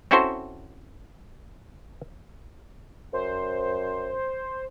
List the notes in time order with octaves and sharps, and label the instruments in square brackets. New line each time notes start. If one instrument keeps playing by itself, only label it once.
[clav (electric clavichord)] C4 C#4 E4 F#4 A4 C5
[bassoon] F#2 [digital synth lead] C5